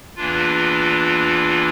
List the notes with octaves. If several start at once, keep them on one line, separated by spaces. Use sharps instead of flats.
E2 E3 A#3 D4 F4